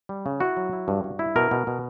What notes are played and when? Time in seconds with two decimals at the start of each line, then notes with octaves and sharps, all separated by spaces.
0.09 G3
0.26 C#3
0.40 E4 F#4
0.57 F#3
0.73 E4
0.88 G2
1.04 G2
1.19 E4
1.36 B2 A#4
1.51 B2
1.67 B2